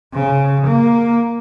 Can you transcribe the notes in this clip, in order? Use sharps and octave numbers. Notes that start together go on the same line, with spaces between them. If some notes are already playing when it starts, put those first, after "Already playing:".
C#3
A#3